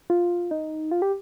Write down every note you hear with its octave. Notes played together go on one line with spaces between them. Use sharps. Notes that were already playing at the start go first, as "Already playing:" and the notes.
F4
D#4
F4
G4